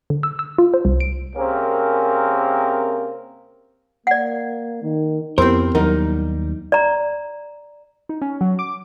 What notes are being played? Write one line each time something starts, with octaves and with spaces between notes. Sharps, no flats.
D3
E6
E6
F4
C5
C2
D7
C3 A#3 C4 C#4 G#4 A#4
A#3 D5 F#5
D#3
F2 B3 C4 E4 G4 A#4 C5
D#2 F#3 G3 D#4 A#4
D5 A#5
D#4
C#4
F#3
D6